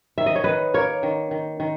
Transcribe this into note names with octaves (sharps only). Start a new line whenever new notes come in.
D#3 E5
D#5
C#5
D#3 B4 D#5
A#3 A#4 C#5
D#3
D#3
D#3